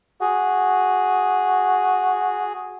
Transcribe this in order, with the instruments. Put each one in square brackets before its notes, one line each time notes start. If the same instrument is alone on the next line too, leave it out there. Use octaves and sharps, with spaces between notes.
[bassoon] F#4 [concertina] G#4